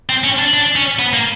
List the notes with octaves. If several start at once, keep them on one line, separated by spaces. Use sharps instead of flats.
C4
C#4
D4
D4
C#4
B3
A#3